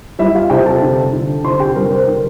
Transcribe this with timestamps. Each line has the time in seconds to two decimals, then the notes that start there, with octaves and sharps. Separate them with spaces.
0.19 G3 E4 E5
0.35 F4 F5
0.50 C3 G4 G5
0.66 A4 A5
0.82 D3
1.13 D3
1.44 C3 C5 C6
1.60 G4 G5
1.76 G3 A#4
1.91 C5
2.07 D3 A#4